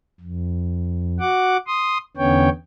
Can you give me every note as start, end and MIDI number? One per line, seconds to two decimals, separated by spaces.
0.21 1.19 41
1.20 1.57 66
1.20 1.57 78
1.20 1.57 86
1.67 1.98 84
1.67 1.98 87
2.17 2.49 40
2.17 2.49 50
2.17 2.49 59
2.17 2.49 61
2.17 2.49 73
2.17 2.49 79